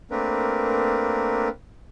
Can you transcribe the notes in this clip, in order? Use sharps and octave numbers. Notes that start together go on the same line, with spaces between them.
A3 A#3 C4 D4 A#4 B4